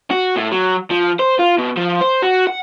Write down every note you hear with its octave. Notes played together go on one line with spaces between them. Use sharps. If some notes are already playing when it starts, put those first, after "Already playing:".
F#4
A2
F#3
F3
C5
F4
B2
F3
C5
F#4
F#5